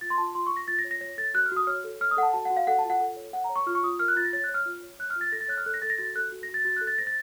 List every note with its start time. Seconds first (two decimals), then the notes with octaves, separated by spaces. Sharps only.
0.01 F4 A6
0.10 C6
0.18 F4 A5
0.35 F4 C6
0.47 C#6
0.52 F4 A#6
0.68 F4 A6
0.79 A#6
0.84 C#5
0.91 A#6
1.01 C#5 A#6
1.18 A4 A6
1.34 F#4 F#6
1.46 F6
1.52 F#4 D#6
1.67 C#5 F6
1.84 A4
2.01 C#5 F6
2.11 D#6
2.17 A4 F#5
2.23 A5
2.33 F#4 A5
2.45 F#5
2.50 F#4
2.57 F5
2.67 A4 F#5
2.79 A5
2.84 F4
2.90 F#5
3.00 A4
3.16 C#5
3.33 A4 F#5
3.44 A#5
3.49 C#5
3.56 C#6
3.66 F4 F6
3.75 C#6
3.83 F4 D#6
3.99 A#4 F6
4.08 F#6
4.16 F4 A6
4.25 A#6
4.33 C#5 A6
4.44 F#6
4.49 C#5
4.54 F6
4.66 F4
4.83 C#5
4.99 C#5 F#6
5.10 F6
5.16 F4
5.21 A6
5.32 A4 A#6
5.41 A6
5.48 C#5 F#6
5.57 F6
5.66 A4 F#6
5.74 A#6
5.82 A4 A6
5.90 A#6
5.98 F#4 A6
6.15 A4 F#6
6.32 F#4
6.43 A#6
6.48 F#4
6.54 A6
6.65 F#4 A6
6.76 F#6
6.81 A4
6.87 A6
6.98 C5 A#6
7.07 A6